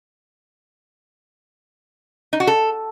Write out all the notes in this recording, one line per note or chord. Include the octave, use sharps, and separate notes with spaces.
D#4
F#4
A4